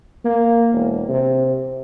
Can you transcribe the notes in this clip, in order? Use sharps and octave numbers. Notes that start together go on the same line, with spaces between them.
A#3
E1
C3